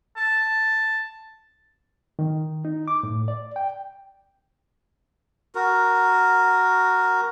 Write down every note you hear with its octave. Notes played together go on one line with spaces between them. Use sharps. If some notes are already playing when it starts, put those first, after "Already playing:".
A5
D#3
D#4
D6
A2
D5
G5
F#4 A#4